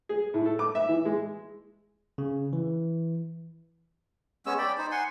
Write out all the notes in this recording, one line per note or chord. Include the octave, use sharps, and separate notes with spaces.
G#4
A2
A4
D6
E5
E3
G#3
C#3
E3
G#3 B3 C#4 E6
D5 G5 B5
D#4 C5
F#5 G#5 C6